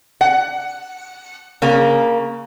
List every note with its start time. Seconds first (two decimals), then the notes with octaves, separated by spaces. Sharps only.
0.21 F#5
1.62 C#3 A#3